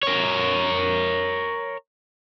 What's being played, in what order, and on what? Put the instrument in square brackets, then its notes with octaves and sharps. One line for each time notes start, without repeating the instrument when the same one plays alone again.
[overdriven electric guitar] A#4 C#5